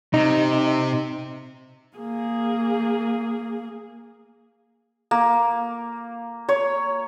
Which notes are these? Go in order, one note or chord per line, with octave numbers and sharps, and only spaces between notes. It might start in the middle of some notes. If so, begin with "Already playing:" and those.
C3 D#4
A#3 G#4
A#3
C#5